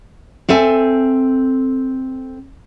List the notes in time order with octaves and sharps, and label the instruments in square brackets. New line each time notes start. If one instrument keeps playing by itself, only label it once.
[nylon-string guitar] C4 A4 E5 G#5